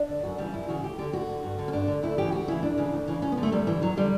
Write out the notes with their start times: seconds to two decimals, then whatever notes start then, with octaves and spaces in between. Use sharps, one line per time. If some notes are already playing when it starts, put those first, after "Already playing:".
Already playing: D4
0.09 D3
0.23 F#2 F#4
0.38 C#3 E3 G3
0.53 F#2 E4
0.68 C#3 E3 F#4
0.83 D2 G4
0.98 D3 G4
1.13 D2 F#4
1.29 D3
1.44 G2
1.58 D3
1.68 C#4
1.72 G2 D4
1.88 D3
2.03 D2 E4
2.18 C#3 E3 G4
2.32 D2 F#4
2.48 C#3 E3 E4
2.63 D2 D4
2.78 C#3 E3
2.93 D2
3.08 C#3 E3
3.22 E2 C#4
3.32 B3
3.38 D3
3.43 A3
3.52 E2 G3
3.67 D3 E3
3.82 E2 F#3
3.97 D3 G3